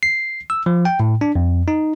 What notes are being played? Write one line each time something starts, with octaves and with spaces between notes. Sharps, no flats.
C7
E6
F3
G5
A2
D4
F2
D#4